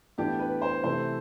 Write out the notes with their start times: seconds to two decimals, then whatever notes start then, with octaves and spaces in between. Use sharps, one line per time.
0.18 A2 E3 B3 D4 G4
0.39 B4
0.62 C5
0.84 C3 E3 A3 C4 C5